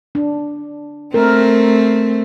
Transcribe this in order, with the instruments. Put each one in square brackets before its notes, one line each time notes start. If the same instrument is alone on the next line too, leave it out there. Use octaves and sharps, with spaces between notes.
[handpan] D4
[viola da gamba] A3 C4 [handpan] A#4